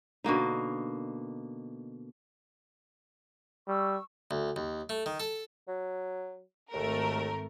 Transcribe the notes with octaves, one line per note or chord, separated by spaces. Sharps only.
B2 D3 A#3 D#4
G3 C#6 E6
D2
D#2
A3
D#3
A4
F#3
G#1 D#2 A3 A#4